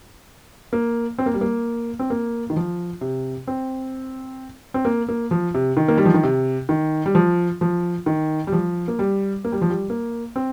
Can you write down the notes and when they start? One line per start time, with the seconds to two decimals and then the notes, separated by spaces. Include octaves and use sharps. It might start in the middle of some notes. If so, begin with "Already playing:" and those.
0.73 A#3
1.18 C4
1.26 A#3
1.34 G3
1.41 A#3
1.99 C4
2.10 A#3
2.50 D#3
2.56 F3
3.01 C3
3.47 C4
4.74 C4
4.85 A#3
5.08 A#3
5.31 F3
5.54 C3
5.77 D#3
5.88 A#3
5.97 G3
6.05 F3
6.14 D#3
6.23 C3
6.69 D#3
7.06 G3
7.15 F3
7.61 F3
8.06 D#3
8.47 G3
8.52 F3
8.88 A#3
8.99 G3
9.45 A#3
9.52 G3
9.62 F3
9.70 G3
9.90 A#3
10.36 C4